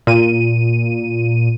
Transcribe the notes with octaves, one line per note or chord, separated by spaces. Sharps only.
A#2 D#7